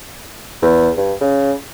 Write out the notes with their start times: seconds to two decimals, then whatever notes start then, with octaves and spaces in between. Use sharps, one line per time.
0.62 E2
0.97 G2
1.21 C#3